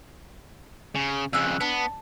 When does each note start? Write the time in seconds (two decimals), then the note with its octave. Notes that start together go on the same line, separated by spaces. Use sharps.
0.95 C#3
1.33 F2 C#3 E6 F#6
1.61 B3 D4